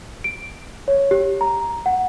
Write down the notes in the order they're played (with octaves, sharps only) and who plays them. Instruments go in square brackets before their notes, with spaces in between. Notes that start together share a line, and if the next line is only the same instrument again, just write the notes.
[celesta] D7
C#5
G4
A#5
F#5